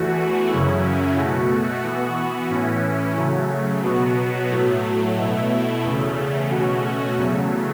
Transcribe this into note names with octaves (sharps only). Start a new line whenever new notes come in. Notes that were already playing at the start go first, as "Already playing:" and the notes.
Already playing: E2 E3 A3 F#4
F#2 C#3 F#3 C#4 E4
B2 A3 F#4
E3 B3 F#4
A2 E3 C#4 E4
C#3 F#3 A3
B2 F#3 B3 F#4
A2 F#3 A3
B2 A3 E4
E2 C#3 A3
B2 A3 C#4 F#4
E2 C#3 F#3 A3